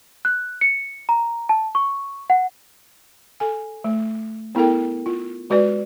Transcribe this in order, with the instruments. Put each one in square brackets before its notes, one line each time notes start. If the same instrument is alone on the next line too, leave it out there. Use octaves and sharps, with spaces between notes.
[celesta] F#6
C#7
A#5
A5
C#6
F#5
[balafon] A4 G#5
A3
B3 E4 A4 A#4 G5
F4
G#3 F#4 B4 D5